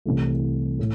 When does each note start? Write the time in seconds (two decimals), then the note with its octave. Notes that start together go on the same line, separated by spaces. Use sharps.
0.06 C2 C3 E3 A3
0.79 A2